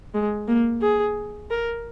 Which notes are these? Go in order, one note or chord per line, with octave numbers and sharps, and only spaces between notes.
G#3
A#3
G#4
A#4